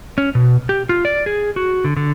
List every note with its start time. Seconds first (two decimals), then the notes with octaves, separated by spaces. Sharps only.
0.18 C#4
0.35 B2
0.69 G4
0.89 F4
1.05 D5
1.26 G#4
1.56 F#4
1.84 D3
1.97 D3